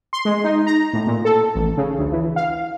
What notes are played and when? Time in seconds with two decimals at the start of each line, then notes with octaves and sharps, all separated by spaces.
0.13 C6
0.25 G#3
0.44 D#4
0.66 A#5
0.93 A2
1.07 A#2
1.25 A4
1.55 A1
1.77 C#3
1.98 D2
2.12 E3
2.36 F5